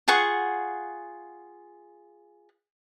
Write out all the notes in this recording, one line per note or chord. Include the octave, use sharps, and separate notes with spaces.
F4 G#4 F#5 C#6